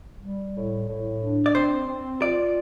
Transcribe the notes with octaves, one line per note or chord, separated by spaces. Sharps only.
G3
A2
A2
D4
D5
C4 C5
C4
F4 D5